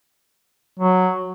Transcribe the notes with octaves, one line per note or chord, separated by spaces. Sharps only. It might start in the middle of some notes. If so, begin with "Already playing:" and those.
F#3